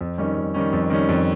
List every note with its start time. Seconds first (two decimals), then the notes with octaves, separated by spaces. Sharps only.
0.01 F2
0.18 D#3 G3 C#4
0.37 F2
0.54 D#3 G3 C#4
0.73 F2
0.90 D#3 G3 C#4
1.09 F2